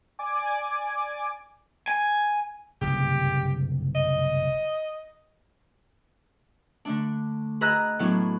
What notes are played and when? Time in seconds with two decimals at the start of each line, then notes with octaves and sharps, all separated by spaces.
0.19 D5 G#5 D6
1.88 G#5
2.81 F#1 C2 G2 G4
3.95 D#5
6.85 D3 A3 D4
7.61 G#4 B4 D#5 A#5 E6 F#6
7.99 A2 E3 F#3 B3 D4 E4